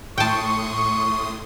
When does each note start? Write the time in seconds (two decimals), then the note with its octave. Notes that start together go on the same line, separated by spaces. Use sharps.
0.18 A2 G5 A5 C6 C#6 D#6